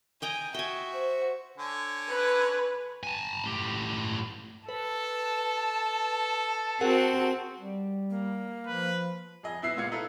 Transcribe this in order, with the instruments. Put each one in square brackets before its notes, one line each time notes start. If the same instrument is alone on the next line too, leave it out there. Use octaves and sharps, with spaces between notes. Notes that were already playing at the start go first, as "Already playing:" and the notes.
[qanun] D#5 G5 A#5 [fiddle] G#5
[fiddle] F#4 E5 [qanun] G5 G#5
[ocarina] C5
[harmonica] D3 C#5 G#5
[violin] B4
[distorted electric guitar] G#5 A5
A2 G4
[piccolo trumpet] A4 [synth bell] B4 [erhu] A5
[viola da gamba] C4 F#4 [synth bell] G#4 A#4 F#5
[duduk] G3
[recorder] A#3
[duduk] F3 [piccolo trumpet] B4
[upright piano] F2 G#4 D#5 D#6
B3 E4 E5 C7
A#2 G#3 F5 G#6 C#7
D#4 E4 A4 B4